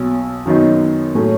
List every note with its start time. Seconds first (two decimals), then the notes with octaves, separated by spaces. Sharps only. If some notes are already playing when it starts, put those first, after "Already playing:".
Already playing: B1 B2 F#3
0.45 F#2 D#3 F#3 B3 D#4
1.15 A2 F#3 A3 C#4 G#4